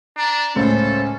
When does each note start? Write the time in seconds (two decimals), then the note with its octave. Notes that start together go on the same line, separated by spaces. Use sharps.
0.17 D4 A#5
0.56 C#2 A2 C#4 A4 C5